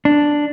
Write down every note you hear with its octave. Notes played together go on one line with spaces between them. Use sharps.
D4